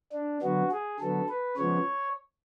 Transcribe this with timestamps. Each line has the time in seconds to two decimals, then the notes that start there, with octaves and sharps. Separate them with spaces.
0.13 D4
0.42 D3 F#3 B3 F#4
0.71 G#4
1.00 D3 F#3 B3 A4
1.29 B4
1.57 C#3 F3 G#3 B3 C#5